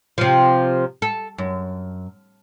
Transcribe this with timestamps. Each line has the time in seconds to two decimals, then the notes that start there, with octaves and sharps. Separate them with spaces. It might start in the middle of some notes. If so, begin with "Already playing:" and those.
0.18 C3 F3
1.02 A4
1.38 F#2